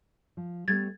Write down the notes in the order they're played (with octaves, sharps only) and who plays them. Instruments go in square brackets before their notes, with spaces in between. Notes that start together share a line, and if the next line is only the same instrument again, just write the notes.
[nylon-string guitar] F3
[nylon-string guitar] G3 A3 B3 [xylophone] G#6 A6